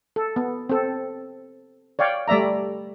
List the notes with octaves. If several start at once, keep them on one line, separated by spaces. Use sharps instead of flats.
A4
B3
C4 A4
C#5 D5 F5 G5
G3 A3 D5 E5 A#5